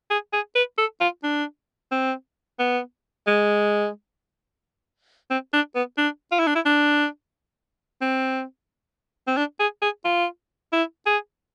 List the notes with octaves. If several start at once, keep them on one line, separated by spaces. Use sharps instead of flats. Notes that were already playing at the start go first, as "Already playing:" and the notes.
G#4
G#4
B4
A4
F4
D4
C4
B3
G#3
C4
D4
B3
D4
F4
E4
D4
E4
D4
C4
C4
D4
G#4
G#4
F4
E4
G#4